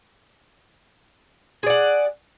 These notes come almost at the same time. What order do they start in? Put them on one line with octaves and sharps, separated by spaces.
G#4 D5 F#5